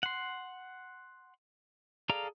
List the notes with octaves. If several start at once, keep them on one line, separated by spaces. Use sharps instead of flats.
F#5 C6
G#4 A4 D5 F5 A#5